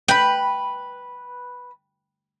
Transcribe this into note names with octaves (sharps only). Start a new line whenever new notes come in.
B4 G5 B5